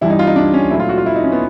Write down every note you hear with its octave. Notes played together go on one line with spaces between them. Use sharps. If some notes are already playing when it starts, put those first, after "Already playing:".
G2 E3 G3 E4
D#4
F4
D#4
D4
C#4
A#2 F#3 A3 E4
F4
F#4
F4
E4
D#4
C#4
B3